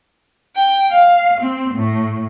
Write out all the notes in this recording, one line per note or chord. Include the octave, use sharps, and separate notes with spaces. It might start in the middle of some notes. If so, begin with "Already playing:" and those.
G5
F5
C4
A2